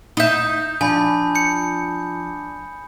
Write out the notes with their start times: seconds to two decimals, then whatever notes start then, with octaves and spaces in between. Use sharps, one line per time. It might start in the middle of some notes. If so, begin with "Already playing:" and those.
0.17 D#4 E5 D#6 G6
0.81 F3 D4 G#5 B5 G6
1.35 G6 C#7